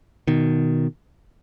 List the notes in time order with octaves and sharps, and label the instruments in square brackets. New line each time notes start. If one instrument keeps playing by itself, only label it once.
[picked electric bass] B2 D#3